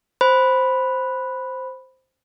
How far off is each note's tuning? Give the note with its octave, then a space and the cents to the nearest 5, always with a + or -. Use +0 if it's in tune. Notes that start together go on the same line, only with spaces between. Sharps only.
C5 +0 B5 +0